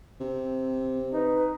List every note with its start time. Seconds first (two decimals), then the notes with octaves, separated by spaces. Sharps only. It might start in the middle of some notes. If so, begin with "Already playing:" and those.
0.21 C3 C4
1.13 D#4 B4